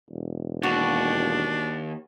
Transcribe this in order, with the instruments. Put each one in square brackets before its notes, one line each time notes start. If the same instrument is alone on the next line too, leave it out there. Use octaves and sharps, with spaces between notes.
[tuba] E1
[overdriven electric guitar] D#2 [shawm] D4 [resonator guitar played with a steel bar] F#4